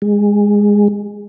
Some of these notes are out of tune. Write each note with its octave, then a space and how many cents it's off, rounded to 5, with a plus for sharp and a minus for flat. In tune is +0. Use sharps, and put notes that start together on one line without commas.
G#3 -15